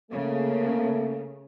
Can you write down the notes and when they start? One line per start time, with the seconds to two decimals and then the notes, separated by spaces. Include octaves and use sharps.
0.11 C#3 A3 A#3